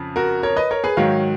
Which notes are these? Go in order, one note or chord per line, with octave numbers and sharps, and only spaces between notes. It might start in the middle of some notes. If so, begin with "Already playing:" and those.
Already playing: F2 C#3
F#4 A#4
A#4 C#5
B4 D#5
A#4 C#5
G#4 B4
G#2 D#3 F#3 C#5 F5